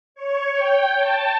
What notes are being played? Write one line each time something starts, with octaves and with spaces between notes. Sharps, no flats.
C#5
G5
A5